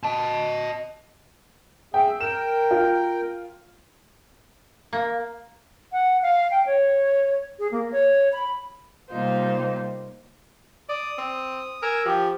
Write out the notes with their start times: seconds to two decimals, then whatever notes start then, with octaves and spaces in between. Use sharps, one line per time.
0.04 D#5 A5
1.94 G#4 E5 G5
2.20 A#4 G5 E7
2.71 F4
4.93 A#3
5.92 F#5
6.22 F5
6.51 G5
6.66 C#5
7.59 G#4
7.71 A#3
7.92 C#5
8.33 B5
9.09 C3 G3 A#3 D#4 F4 C5
10.89 D5 D#6
11.18 C4
11.82 A#4 G#5 E6
12.05 F3 G4